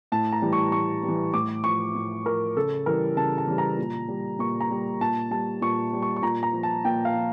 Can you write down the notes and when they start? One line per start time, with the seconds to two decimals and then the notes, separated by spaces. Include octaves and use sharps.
0.12 A2 A5
0.32 A#5
0.42 E3 G3
0.53 C#6
0.72 A2 C#6
1.03 G3
1.08 E3
1.34 A2 D6
1.64 F3 C#6
1.95 A2
2.25 F3 A#4
2.57 C#3 A4
2.86 E3 G3 A#4
3.17 C#3 A5
3.38 A5
3.47 E3 G3
3.58 A#5
3.78 A#2
4.08 G3
4.39 A#2 C#6
4.61 A#5
4.71 G3
5.01 A#2 A5
5.31 G3 A5
5.62 A#2 C#6
5.93 G3
6.02 C#6
6.16 C#6
6.22 A#2 A#5
6.43 A#5
6.53 F3
6.63 A5
6.85 A#2 G5
7.05 F5
7.14 F3